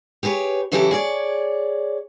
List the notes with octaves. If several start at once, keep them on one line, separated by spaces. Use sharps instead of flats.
G4 G#4 B4 C#5
C#3 E3 F#3 E4 G4 A4
G#4 C#5 D5